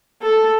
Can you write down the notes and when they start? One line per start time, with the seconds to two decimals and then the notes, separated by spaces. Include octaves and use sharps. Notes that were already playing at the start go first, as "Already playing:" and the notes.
0.22 A4